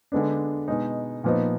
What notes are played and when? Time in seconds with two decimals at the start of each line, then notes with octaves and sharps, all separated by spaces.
0.12 D3 G#3 B3 D4
0.68 B2 G#3 D#4
1.24 A#2 F3 B3 D#4